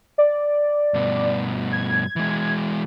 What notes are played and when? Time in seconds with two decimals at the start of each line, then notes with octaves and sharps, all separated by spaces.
0.18 D5
0.94 G2 B2
1.72 G#6
2.16 E3 G#3